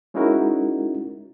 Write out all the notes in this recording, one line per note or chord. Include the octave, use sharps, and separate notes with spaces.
G#3 C#4 D#4 E4 F#4 A#4